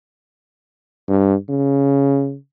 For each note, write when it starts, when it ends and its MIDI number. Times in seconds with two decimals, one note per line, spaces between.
1.08 1.35 43
1.49 2.36 49